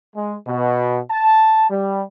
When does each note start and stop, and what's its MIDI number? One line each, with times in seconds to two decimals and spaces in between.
0.15 0.34 56
0.46 0.99 47
1.10 1.67 81
1.70 2.02 55